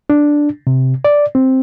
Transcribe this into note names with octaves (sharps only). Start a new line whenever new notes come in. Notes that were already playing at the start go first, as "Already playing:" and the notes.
D4
C3
D5
C4